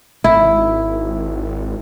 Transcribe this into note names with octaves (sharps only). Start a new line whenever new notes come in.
G#1 E4